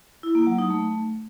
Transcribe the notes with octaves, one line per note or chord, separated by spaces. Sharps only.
E4
A#3
F#3
D#4
A3